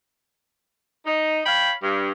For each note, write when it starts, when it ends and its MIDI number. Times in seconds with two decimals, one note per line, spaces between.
1.06 1.40 63
1.46 1.72 73
1.46 1.72 77
1.46 1.72 79
1.46 1.72 83
1.82 2.11 43